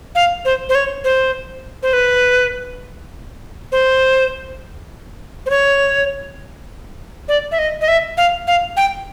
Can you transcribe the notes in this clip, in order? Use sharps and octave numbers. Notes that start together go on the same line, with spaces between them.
F5
C5
C5
C#5
C5
C5
B4
C5
C5
C#5
D5
E5
D#5
D#5
E5
F5
F5
G5